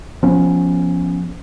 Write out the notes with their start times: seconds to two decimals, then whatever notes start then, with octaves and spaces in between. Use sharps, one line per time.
0.23 F3 B3 C#4